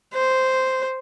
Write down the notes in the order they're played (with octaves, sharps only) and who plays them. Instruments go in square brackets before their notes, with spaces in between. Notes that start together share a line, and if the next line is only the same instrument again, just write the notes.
[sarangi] C5